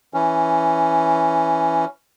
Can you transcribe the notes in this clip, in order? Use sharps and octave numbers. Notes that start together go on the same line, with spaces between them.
E3 C#4